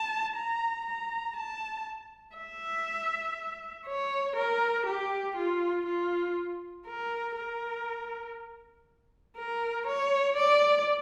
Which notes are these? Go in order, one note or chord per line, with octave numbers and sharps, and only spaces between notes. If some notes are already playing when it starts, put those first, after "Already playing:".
Already playing: A5
A#5
A#5
A5
E5
C#5
A#4
G4
F4
F4
A#4
A#4
A#4
C#5
D5